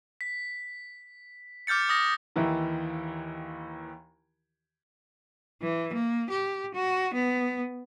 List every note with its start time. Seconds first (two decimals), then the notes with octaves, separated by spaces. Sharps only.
0.21 B6
1.67 D6 F6 G6 A6 C#7
1.89 D#6 A#6
2.36 D#2 D#3 E3 E4
5.62 E3
5.93 A#3
6.30 G4
6.74 F#4
7.14 B3